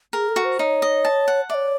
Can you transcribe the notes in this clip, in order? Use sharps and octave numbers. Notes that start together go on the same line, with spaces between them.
G#4 A#4
A4
F#4
C5
D#4 C#5
D#5
A5
F#5
C#5 D5 E5